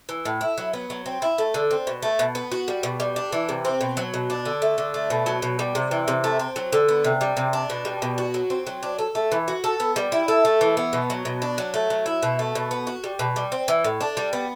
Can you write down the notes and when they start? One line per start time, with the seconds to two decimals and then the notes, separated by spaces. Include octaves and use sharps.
0.09 E3
0.25 A2
0.41 E4
0.58 F#3
0.73 B3
0.90 F#3
1.06 C4
1.22 E4
1.38 A3
1.54 D3
1.71 C4
1.87 B2
2.03 A3
2.19 B2
2.35 B3
2.52 F#4
2.68 G3
2.83 B2
3.00 G3
3.16 D4
3.33 E3
3.49 C3
3.65 C4
3.81 B2
3.97 F#3
4.14 B2
4.30 D4
4.45 D3
4.62 A3
4.78 D3
4.94 A3
5.10 B2
5.26 F#3
5.42 B2
5.59 G3
5.75 C3
5.91 E3
6.08 C3
6.24 A3
6.39 C4
6.56 F#3
6.73 D3
6.88 B3
7.04 C3
7.21 G3
7.37 C3
7.53 D4
7.70 B2
7.85 G3
8.02 B2
8.18 F#4
8.34 F#3
8.50 C4
8.67 F#3
8.83 D4
8.99 A4
9.15 A3
9.32 E3
9.48 F#4
9.64 A4
9.80 B3
9.96 G3
10.12 E4
10.28 A4
10.45 A3
10.61 E3
10.77 B3
10.93 B2
11.10 F#3
11.25 B2
11.42 D4
11.58 F#3
11.74 A3
11.90 F#3
12.06 E4
12.23 B2
12.39 A3
12.55 B2
12.71 B3
12.87 F#4
13.04 G3
13.19 B2
13.36 G3
13.52 C4
13.68 E3
13.84 A2
14.01 D4
14.17 G3
14.33 B3